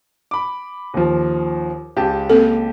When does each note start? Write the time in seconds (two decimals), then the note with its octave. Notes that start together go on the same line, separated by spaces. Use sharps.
0.31 B5 D6
0.94 D#2 F3
1.96 C#2 G4 A5
2.30 A#3 C4 A4